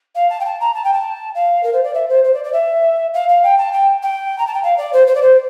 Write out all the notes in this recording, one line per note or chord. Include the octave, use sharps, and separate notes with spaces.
F5
A5
G5
A5
A#5
A5
G5
A5
F5
A#4
C5
D5
E5
C5
C5
D5
D5
E5
F5
F5
G5
A5
G5
G5
A#5
A5
G5
F5
D5
C5
C5
D5
C5